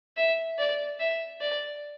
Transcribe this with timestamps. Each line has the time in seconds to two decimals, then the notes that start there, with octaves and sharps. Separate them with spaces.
0.17 E5
0.58 D5
1.00 E5
1.41 D5